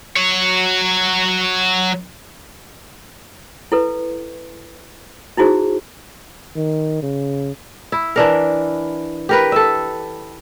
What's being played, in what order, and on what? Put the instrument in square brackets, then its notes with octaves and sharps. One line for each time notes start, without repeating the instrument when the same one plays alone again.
[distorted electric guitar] F#3 C#5
[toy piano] E4 A4 B4
D#4 E4 F#4 G#4 C5
[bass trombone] D#3
C#3
[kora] E4
E3 D4 A#4
G4 A#4 B4
A4 E5